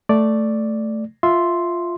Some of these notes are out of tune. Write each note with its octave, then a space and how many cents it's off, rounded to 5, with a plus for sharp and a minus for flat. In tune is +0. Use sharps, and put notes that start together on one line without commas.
A3 +0 D5 +0
F4 +0 E5 +0 C6 +0